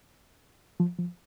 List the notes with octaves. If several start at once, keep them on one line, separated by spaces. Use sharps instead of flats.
F3
F3